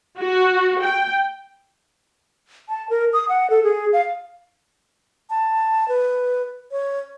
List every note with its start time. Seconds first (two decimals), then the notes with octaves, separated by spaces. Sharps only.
0.19 F#4
0.83 G5
2.69 A5
2.90 A#4
3.13 D#6
3.29 F#5
3.50 A4
3.63 G#4
3.93 F5
5.30 A5
5.88 B4
6.71 C#5